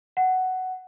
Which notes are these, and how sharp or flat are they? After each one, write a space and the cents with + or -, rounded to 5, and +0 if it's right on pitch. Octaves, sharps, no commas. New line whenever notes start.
F#5 +10